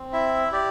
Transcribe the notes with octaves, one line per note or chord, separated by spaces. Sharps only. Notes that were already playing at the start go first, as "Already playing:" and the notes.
Already playing: C4
E4 E5
G4 D5